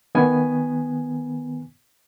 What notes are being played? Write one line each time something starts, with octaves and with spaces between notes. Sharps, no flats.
D#3 B3 G#5